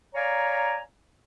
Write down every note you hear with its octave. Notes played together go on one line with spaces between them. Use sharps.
C#5 D5 F5 G#5 A#5